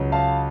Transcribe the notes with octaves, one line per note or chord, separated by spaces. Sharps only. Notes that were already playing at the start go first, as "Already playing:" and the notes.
Already playing: C#2 C#3 F#3
F5 A5